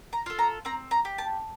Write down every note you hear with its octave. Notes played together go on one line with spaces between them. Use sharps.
A#5
F4 A4
A#5
C4 A#5
A#5
G4
A5